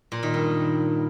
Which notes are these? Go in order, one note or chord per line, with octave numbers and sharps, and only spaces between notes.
A#2
D#3
G2